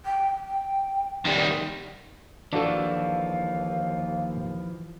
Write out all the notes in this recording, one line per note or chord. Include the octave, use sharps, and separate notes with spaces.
G5
G5
D#3 G3
D#2 E3 F3 D4 F#4 A4 F5